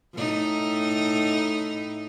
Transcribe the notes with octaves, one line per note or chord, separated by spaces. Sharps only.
A2 D#4